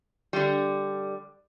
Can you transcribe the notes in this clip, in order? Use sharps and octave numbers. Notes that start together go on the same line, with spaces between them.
D3 G3